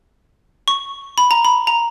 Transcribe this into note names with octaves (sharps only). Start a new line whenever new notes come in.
C#6
B5
A#5
B5
A#5